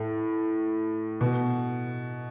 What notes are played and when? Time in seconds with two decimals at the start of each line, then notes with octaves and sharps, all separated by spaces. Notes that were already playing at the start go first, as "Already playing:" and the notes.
Already playing: A2
1.21 B2